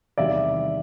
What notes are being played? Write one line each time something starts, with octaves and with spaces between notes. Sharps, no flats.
E2 C3 D#3 G3 D5 E5